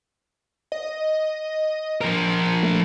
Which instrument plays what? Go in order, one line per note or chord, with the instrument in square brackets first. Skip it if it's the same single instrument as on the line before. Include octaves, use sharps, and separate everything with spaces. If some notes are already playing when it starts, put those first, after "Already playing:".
[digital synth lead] D#5
[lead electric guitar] F3 A#4
[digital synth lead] A3